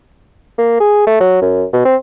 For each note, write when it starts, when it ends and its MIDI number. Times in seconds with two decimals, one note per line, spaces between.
0.58 0.77 58
0.80 1.03 68
1.07 1.20 57
1.20 1.41 54
1.42 1.65 42
1.73 1.81 47
1.85 1.96 60